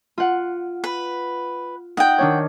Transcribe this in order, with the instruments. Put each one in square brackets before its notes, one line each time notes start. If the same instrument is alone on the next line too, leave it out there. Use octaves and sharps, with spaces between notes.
[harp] F4 F#5
[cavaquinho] B4
[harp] D#4 [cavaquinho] F#5 G5
[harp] D#3 D4 C#5